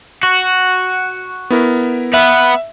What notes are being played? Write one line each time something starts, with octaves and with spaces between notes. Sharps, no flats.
F#4
B3 E4 A#4
B3 B4 E5